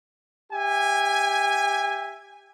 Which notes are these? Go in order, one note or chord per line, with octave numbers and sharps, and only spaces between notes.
G4 E5 G#5